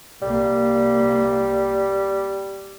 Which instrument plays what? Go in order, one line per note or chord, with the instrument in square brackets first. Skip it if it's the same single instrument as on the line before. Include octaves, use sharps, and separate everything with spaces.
[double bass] C2 A#3 [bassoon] G3